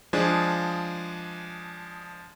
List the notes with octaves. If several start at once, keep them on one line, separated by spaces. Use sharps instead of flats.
F3 G#3 D4 G#4